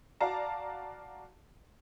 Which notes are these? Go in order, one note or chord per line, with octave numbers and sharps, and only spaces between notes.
F#4 D5 F5 A5 A#5